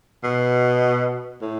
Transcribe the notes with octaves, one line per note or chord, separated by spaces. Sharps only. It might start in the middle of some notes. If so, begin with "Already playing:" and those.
B2
A2